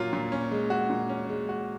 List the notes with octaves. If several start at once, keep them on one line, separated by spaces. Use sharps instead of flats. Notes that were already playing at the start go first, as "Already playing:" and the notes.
Already playing: A#2 F#3 A#3 F4
A#2
C#4
G#3
F#4
A#2
C#4
G#3
F#4